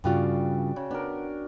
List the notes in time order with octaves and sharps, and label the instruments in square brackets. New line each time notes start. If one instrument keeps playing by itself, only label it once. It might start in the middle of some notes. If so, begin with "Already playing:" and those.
[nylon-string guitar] G2 C#3 F4 [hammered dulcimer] F#4 D5 G5
[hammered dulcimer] C#3
[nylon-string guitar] B3 [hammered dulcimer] D4 A#4